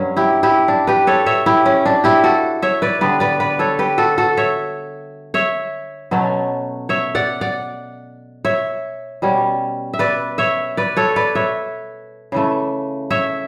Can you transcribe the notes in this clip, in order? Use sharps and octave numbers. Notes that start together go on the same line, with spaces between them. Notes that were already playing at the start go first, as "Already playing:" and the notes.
Already playing: G2 F#3 C#4
E4 G4
E4 G4
D4
G4 B4
A4 C#5
C#5 E5
E4 G4
C#4
D4
E4 G4
F#4 A4
C#5 E5
B4 D5
D3 G3 B3 B4 D5
B4 D5
B4 D5
A4 C#5
G4 B4
F#4 A4
F#4 A4
C#5 E5
C#5 E5
B2 F#3 A3 C#4
C#5 E5
D5 F#5
D5 F#5
C#5 E5
B2 G3 C#4
E5
B4 D5
C#5 E5
B4 D5
A4 C#5
B4 D5
C#5 E5
C#3 E3 A3
C#5 E5